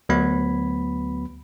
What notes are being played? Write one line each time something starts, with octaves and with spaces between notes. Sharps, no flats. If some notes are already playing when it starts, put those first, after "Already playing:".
D2 F#3 B3 B5